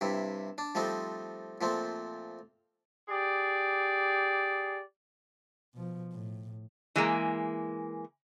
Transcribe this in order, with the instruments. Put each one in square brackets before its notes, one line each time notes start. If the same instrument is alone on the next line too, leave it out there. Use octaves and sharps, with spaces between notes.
[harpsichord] G2 C3 E4
D4
F3 G3 A3 C4 D#4
A#2 F3 A3 C4
[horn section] G4 G#4 D5
[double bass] B2 F3
A2
[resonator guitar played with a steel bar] E3 G#3 A#3